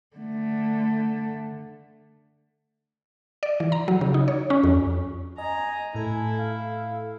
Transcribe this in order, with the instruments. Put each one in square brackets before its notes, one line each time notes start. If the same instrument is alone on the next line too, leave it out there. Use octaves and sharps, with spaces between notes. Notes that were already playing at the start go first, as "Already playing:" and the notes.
[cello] D3 A3
[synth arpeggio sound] D5
E3
A#5
F#3
C#3
D#4
C#5
C#4
F2
[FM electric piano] D#5 [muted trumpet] G#5 [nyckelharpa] A#5
[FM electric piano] A2 A4 [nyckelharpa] E4
[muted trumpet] F5